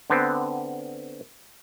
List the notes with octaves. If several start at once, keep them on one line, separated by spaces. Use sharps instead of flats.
D3 B3 C4